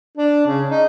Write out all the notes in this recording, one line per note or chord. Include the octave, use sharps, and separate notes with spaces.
D4
C#3
D#4